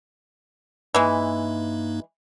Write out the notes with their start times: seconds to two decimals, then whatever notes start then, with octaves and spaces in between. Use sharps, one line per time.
0.94 G2 E3 G#3 A#3 D#4